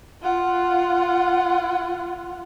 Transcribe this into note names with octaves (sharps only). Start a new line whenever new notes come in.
F4 F#5